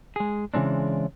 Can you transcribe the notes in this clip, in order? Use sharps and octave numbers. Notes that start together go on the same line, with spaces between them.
G#3 G#4
C#3 E3 G#3 C4 D4